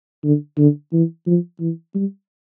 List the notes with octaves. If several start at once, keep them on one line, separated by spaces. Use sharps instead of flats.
D3
D3
E3
F3
E3
G3